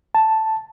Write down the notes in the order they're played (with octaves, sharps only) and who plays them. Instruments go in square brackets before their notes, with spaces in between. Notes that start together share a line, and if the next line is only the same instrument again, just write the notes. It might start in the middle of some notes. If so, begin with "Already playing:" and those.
[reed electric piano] A5